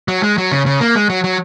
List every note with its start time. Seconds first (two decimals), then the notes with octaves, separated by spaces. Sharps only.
0.08 F#3
0.23 G#3
0.38 F#3
0.52 C#3
0.66 C#3
0.81 A#3
0.95 G#3
1.10 F#3
1.24 F#3